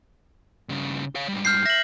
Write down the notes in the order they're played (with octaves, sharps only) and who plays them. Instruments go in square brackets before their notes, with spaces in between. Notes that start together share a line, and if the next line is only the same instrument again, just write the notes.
[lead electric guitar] G2 C#3
C#5 F5
G#2 G3
[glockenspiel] F6 G6 C7
[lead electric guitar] E5 [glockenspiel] A#6 F#7